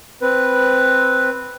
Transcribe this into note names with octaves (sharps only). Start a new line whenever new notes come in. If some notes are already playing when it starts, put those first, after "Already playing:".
C4 B4